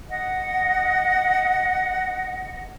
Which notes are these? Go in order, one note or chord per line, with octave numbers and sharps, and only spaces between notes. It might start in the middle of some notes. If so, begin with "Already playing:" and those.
D#5 F#5